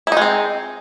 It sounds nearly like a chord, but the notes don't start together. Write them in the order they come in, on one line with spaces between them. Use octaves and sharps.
E4 D#4 G#3 C4